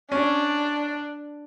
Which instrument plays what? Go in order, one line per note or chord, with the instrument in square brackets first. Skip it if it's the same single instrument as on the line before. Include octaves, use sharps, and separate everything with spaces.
[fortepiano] C#4 [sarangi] D4